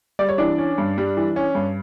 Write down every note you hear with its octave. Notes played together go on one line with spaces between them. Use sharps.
G3 D5
C#5
E3 D4 D5
C#4
G2
G3
E3
C#4
G2